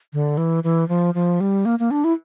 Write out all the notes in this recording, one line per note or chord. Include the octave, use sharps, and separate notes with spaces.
D3
E3
E3
F3
F3
G3
A#3
A#3
D4
E4